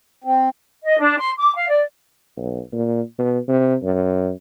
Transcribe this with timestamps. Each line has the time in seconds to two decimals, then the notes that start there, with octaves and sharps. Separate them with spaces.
0.24 C4
0.84 D#5
0.99 D4
1.18 C6
1.37 D6
1.55 F5
1.68 D5
2.36 B1
2.73 A#2
3.18 B2
3.48 C3
3.83 F#2